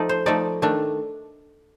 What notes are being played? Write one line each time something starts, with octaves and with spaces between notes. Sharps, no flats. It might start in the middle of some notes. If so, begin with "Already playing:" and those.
Already playing: F3 A3 D#4 D5
C5
F3 A3 D#4 D5
D#3 A3 D4